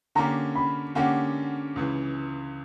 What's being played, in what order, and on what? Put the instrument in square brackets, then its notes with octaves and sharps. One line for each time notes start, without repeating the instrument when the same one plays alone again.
[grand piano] D3 A#3 C#4 G4 [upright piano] A#5
[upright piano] B5
[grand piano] D3 A#3 C#4 G4 [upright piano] F#5
[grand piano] C#2 C#3 E3